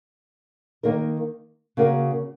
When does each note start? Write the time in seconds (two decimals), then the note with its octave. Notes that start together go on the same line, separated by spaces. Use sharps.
0.83 D#3 A#3 D#4 A#4
1.77 C#3 A#3 F#4 A#4